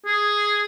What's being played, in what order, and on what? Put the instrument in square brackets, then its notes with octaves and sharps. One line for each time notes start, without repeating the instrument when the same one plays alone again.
[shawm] G#4